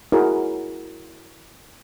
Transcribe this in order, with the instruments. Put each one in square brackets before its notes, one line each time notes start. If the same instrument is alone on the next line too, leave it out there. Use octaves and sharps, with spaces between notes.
[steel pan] E4 F#4 G#4 A#4 C#5